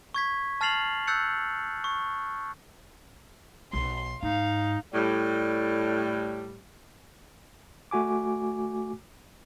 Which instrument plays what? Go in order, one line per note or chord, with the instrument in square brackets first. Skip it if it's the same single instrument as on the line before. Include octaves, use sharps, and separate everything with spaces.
[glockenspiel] C#6 G#6 B6
A5 F6 A6 C7 F7 F#7
E6 F#6 G6 A6 C#7
C#6
[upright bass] B1 [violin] C6
[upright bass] G#2 [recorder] D#4 [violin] F5
[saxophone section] A2 G3
[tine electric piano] A3 F#4 G#5 D6